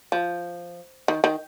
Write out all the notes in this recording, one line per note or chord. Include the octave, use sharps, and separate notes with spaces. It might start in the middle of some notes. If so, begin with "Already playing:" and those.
F3
D#3
D#3